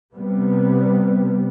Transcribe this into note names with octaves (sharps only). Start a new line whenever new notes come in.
C3 G3 B3